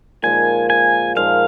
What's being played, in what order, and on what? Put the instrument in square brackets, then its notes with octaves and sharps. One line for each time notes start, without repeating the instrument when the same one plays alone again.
[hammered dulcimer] A#2 F3 G#3 D#4 [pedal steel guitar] G#5
[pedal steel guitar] G#5
[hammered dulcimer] A#2 F3 G#3 D#4 [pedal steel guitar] F5